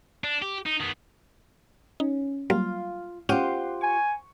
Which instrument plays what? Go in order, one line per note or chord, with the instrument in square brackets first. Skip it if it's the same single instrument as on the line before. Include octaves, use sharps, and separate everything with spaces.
[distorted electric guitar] D4
G4
D#4
D#3 B3
[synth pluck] C#4 [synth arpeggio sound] D#4
[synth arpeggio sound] F#3 G3 A#3 [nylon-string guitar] F4 [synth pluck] F5
[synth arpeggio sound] C#4 F6 D#7 [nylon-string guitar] F4 G4 [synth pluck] C5 F#5 C6
[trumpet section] G#5 [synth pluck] C#6